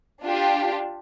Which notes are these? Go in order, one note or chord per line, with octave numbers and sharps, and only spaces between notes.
D4 F4 G4